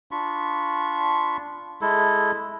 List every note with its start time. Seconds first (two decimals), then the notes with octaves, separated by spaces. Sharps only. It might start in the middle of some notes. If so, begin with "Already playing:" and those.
0.11 D4 F4 B5 C#6
1.81 G#3 E4 A4